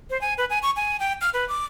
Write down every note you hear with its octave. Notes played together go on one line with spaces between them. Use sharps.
C5
G#5
B4
G#5
C#6
G#5
G5
F6
B4
D6